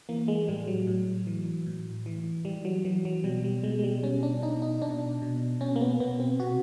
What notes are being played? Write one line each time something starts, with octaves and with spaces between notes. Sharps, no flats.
E3 A#3
G#3
A2 G3
F#3
A2
E3
A2
E3
E3 G3
F#3
E3 F#3
F#3
B2 G3
G3
B2 G#3
G#3
G3
B2 C#4
D4
B2 D#4
D#4
B2 D4
B2
B2 C#4
A#3
B3
B2 B3
C4
C3 F#4